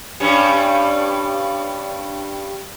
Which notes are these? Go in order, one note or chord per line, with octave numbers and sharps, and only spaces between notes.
G2 G3 C#4